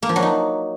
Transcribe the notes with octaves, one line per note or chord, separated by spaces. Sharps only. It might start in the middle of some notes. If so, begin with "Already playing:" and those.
A#3
F3
F#3
D#4